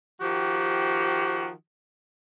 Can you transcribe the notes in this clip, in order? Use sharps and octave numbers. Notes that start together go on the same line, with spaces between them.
D#3 F3 F#4 G4